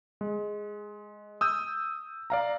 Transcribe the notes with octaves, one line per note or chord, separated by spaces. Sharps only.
G#3
D#6 E6 G6
D5 F5 A#5